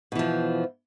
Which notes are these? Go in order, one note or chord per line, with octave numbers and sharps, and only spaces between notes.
B2 E3 F3